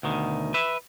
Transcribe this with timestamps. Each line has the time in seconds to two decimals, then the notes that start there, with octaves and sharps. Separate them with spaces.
0.03 D2 B2 D#3
0.54 B4 E5